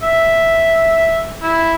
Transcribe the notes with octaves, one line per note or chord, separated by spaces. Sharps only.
E5
E4